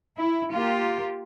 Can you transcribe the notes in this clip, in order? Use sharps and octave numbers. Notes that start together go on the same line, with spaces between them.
E4
A#3 F4 G4